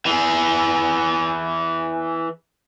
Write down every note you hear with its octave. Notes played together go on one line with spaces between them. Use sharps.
E3 G#4